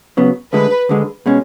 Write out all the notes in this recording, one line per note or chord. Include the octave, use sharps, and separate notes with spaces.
C#3 F#3 B3
D2 D3 G#3 B4
D2 D3 G#3
B2 G#3 C#4